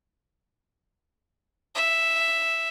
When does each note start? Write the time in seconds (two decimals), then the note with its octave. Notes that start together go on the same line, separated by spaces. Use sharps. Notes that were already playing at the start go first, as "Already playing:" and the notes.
1.75 E5